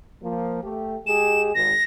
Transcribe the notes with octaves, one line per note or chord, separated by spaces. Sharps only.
F3 A#3
A3 G4
G#3 G4 G#4 E7
G#1 A#6